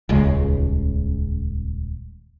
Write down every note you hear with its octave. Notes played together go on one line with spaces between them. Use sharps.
D#1 C#2 C#3 G#3